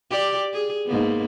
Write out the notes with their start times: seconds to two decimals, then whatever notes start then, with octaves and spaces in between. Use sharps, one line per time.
0.11 G4 D5
0.53 G#4
0.86 G#2 A#3 B3